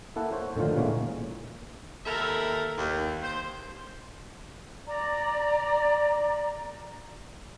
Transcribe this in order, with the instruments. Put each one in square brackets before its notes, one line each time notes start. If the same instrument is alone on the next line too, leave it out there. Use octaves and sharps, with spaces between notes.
[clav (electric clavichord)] A#3 E4 A4 F#5
C5 C#5
A2 D3 D#3 F3 F4
A#2 C#3 E3 G#3 A#3 C#5
[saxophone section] D#2 E4 A4 A#4 E5
D#2
C5
[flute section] D5 A#5